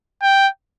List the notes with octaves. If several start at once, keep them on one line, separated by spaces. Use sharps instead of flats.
G5